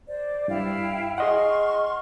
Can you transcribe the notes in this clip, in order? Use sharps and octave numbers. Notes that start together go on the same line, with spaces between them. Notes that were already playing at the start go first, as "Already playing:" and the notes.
C5 D5
G2 E4 F5 G5
G#4 D#5 F#5 C6 C#6 F6